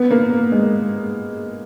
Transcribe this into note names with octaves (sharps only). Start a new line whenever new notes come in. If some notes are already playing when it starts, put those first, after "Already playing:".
Already playing: B3
A#3
G#3